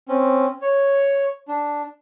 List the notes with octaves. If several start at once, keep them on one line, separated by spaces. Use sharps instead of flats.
C4 C#4
C#5
D4